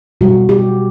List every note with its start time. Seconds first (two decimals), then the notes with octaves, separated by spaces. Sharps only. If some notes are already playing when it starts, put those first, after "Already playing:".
0.21 B2 G3 F#4
0.49 G4